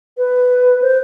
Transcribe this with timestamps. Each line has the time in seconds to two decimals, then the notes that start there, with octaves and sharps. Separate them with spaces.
0.17 B4
0.82 C5